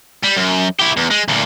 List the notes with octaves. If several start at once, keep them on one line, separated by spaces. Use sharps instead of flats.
G3
F#2
E4 G4
E2
G#3
D2 A#2